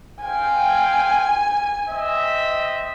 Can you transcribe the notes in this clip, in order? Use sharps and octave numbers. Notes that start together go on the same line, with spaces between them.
C4 F5 G5 G#5
C4 D#5 E5